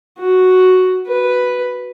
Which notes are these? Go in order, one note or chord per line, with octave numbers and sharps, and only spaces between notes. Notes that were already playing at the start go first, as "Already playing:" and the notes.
F#4
B4